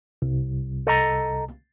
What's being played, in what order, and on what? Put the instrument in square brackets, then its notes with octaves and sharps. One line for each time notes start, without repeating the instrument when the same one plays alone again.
[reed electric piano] C2
[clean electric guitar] A4 D#5 A#5